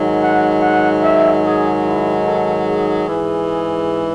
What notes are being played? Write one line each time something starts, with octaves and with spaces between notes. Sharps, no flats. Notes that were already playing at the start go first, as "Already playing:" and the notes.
Already playing: G#2 D#3 F#3
F#5
F#5
E5
G#4
E4
A4
G#4
G#2 E3